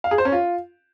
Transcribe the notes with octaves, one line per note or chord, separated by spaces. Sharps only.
F5
G#4
C5
C#4
F4